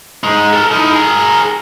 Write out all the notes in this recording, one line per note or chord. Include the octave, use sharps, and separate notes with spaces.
G#3 D#4
A4 A#4
D#4 E4
G#4 A#4